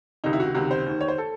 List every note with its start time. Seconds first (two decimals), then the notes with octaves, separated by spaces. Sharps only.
0.24 C#2 C3 D#3 D#4
0.33 E4
0.40 F#4
0.55 C#2 C3 D#3 F#4
0.71 C5
0.86 D#2 D#3
1.01 C#5
1.08 C5
1.18 A4